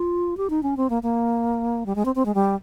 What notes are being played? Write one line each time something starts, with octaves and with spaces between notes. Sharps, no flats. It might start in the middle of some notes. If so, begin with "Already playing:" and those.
Already playing: F4
G4
D#4
C#4
C4
A#3
A#3
G3
G#3
C4
C4
G#3
G3